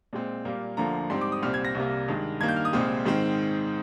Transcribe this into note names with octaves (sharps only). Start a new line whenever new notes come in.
A#2 G#3 C4
A#2 G3 A#3
D2 D3 F3 A#3 A#5
G#2 G3 C4 C6
D6
D#6
C2 A#2 G3 C4 F6
G#6
A#6
C2 C3 G3 A#3
G2 D#3 G#3
G2 D#3 A#3 G#6
G6
F6
D#6
C2 A#2 G#3 C4
G#2 D#3 G#3 C4